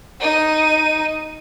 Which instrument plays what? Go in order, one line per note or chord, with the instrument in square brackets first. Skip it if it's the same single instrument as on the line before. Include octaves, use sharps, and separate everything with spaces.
[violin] D#4 D#7